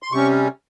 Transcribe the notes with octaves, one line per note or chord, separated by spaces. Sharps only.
C6
C3 G3 C#4 C#6